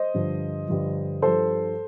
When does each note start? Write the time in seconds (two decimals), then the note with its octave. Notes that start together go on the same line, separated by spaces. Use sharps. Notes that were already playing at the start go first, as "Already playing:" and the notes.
Already playing: C5 D#5
0.14 G2 D3 F3
0.68 G2 D3 F3
1.22 G2 F3 A4 C5